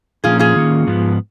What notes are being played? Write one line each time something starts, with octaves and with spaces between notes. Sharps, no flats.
A#2 F3 A#3 C#4 F4 G#4
F4 G#4
D#3 A#3 C#4
G#2 F3 B3